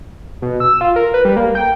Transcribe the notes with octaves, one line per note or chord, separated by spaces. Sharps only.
B2
E6
F4
A#4
B4
G3
A#3
G5